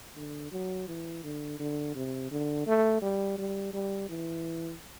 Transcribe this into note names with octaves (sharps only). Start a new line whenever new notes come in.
D3
F#3
E3
D3
D3
C3
D3
A3
G3
G3
G3
E3